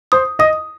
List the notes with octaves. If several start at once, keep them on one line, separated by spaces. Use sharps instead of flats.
C5 D#6
D#5 D#6